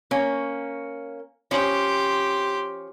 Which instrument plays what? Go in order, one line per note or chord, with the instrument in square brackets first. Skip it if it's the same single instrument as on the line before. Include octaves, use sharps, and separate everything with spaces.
[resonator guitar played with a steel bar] A#3 C#4
[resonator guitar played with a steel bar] F3 C#4 [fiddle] G4 C6